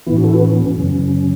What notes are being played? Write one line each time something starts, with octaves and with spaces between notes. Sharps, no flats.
A2 E3 B3 E4
C#4 F#4
E4 A4
F#4 B4
C#4
B3
C#4
F#2 C#3 F#3